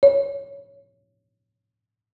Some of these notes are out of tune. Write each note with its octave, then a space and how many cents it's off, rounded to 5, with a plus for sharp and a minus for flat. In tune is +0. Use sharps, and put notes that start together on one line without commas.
C#5 +10